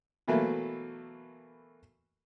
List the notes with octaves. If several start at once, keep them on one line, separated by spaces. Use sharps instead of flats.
B2 E3 F#3 A3 A#3